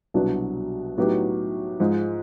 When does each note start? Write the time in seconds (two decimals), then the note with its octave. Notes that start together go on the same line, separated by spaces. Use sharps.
0.14 C2 B2 F#3 B3 D4
0.98 A2 F#3 B3 D#4 G4
1.80 G#2 F3 G#3